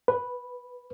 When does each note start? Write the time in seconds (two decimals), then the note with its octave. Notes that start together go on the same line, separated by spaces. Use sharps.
0.08 B4